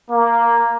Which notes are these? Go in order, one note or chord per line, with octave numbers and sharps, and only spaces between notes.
A#3